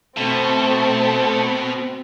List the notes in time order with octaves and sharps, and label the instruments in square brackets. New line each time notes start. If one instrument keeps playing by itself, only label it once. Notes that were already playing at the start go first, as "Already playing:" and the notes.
[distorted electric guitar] B2 [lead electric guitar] A3 [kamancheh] C4